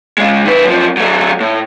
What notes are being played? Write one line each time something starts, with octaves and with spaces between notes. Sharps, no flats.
C#3 G#3
D#3 B4
F#2 F3
F#3 A3
A2